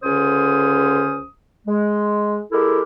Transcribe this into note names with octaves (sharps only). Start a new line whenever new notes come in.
C#2 D3 C#4 C5 D#6
G#3
G#3 E4 G4 A4 A#4